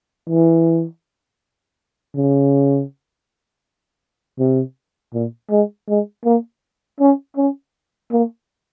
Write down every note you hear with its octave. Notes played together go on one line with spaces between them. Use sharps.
E3
C#3
C3
A#2
G#3
G#3
A#3
C#4
C#4
A#3